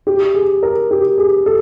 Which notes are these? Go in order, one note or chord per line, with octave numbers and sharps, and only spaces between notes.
G4
G#4
A#4
G4
G#4
A4